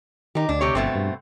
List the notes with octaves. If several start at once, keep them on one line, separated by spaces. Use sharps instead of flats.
D#3 D#4 G4
D2 D4
C3 G4 C#5
G1 B2 A3 C4
G2